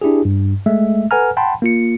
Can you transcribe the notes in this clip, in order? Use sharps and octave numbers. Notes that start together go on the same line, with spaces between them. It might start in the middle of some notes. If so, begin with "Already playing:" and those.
D4 E4 G4 G#4
G2
G#3 A3 E5
A4 B4 F#5 G#5 A#5 F6
F#5 G5 A5 B5 C6
A#3 F4 C#7